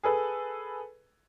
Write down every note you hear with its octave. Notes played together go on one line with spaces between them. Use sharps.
G#4 A4 B4